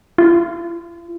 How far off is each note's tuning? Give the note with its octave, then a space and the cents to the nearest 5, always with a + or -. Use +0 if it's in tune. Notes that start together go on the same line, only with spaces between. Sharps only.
F4 -45